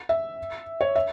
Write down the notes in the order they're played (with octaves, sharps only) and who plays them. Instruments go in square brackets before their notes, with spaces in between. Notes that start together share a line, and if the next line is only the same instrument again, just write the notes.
[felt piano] E5
C#5
E5